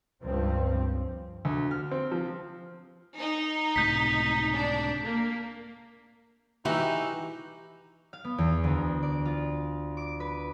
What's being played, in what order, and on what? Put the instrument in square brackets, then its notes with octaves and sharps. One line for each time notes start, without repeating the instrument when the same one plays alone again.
[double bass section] C#2 G2 F3 C4
[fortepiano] D2
F6
C4
F3
[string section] D#4
[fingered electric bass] C#2 A2 C3 [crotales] G6 B6
[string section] D4
A#3
[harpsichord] E3 [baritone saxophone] D#4 [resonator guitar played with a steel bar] F#4 E5 [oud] G4
[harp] F5
B3
E2
D2
D5
F4
D6
B4